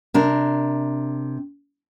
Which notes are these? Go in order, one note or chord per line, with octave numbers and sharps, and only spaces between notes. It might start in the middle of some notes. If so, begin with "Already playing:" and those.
C3 D4 A#4